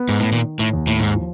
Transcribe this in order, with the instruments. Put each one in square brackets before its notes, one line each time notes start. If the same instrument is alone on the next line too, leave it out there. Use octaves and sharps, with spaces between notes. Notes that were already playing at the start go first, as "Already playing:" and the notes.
Already playing: [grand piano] B3
[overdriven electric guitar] G#2
A2
[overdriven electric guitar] A#2 [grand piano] D#3
[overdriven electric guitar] A2
[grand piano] D#2
[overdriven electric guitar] A2
G#2
[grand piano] F3